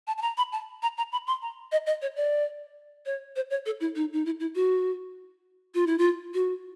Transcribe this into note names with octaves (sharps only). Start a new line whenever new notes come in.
A5
A5
A#5
B5
A5
A#5
A#5
B5
C6
A#5
D#5
D#5
C#5
D5
C#5
C5
C#5
A4
E4
D#4
D#4
E4
E4
F#4
F4
E4
F4
F#4